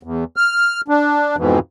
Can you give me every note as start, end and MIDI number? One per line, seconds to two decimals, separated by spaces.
0.03 0.24 40
0.36 0.81 89
0.88 1.36 62
1.37 1.59 41
1.37 1.59 44
1.37 1.59 47
1.37 1.59 52